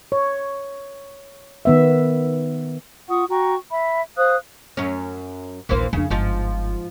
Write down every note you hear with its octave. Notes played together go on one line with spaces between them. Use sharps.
C#5
D#3 B3 E5
F4 F#5 C#6 D#6
F#4 G5 A#5 C#6
E5 B5
C5 F5 D#6 F#6
F#2 C#4
A#1 D#2 E3 A#3 C5
F2 C#3 D4
G1 G#2 F3 F4